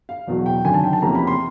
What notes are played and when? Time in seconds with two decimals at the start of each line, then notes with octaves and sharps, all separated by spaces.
0.09 F5
0.27 E1 E2 B2 F#3
0.46 G5
0.65 G#1 F#2 D3 G#5
0.74 A5
0.84 G5
0.93 A5
1.02 E2 C3 F3 A#3 C#4 A#5
1.15 B5
1.27 C6